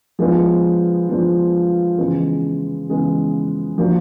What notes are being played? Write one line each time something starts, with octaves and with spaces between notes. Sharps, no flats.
F3 G#3 B3 D4 F4
F3 G#3 B3 D4 F4
C#3 E3 G#3 B3
C#3 E3 G#3 B3
F3 A#3 D4 F#4